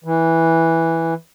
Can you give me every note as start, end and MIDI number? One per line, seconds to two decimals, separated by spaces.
0.04 1.14 52